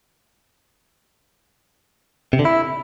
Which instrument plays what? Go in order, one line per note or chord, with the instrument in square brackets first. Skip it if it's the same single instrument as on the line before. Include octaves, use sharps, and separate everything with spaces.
[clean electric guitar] C3
D3
E4